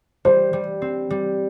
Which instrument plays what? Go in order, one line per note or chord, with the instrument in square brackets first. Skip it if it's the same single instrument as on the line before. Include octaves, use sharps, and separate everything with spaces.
[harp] G3 [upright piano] C5
[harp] G3
C4
G3